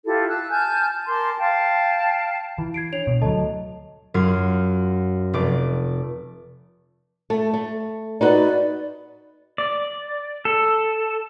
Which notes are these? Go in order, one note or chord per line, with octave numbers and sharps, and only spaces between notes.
E4 F4 G4 A4
A5 E6 F#6
G#5 A5 F6 G6
A#4 A5 C6 D6
F5 G5 A5
E3 E4
G#6 C7 D7
D4 C#5 F7
B2
D2 F#3 A4 D#5 A5
F#2 F#3 F4 G#6
F1 D6
A3
A3
D#4 F#4 B4 D5
D5
A4